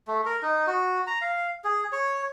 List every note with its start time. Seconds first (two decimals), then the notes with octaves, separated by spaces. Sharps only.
0.07 A3
0.26 A#4
0.42 D#4
0.67 F#4
1.07 A#5
1.21 F5
1.64 G#4
1.92 C#5